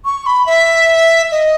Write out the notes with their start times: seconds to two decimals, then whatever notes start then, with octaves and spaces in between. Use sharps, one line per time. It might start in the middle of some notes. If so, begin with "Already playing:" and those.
0.05 C#6
0.26 B5
0.46 E5
1.32 D#5